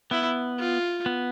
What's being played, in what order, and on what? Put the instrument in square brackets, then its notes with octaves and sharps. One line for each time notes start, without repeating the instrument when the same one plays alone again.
[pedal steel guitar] B3 [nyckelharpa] E4
[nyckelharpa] F4
[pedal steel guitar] B3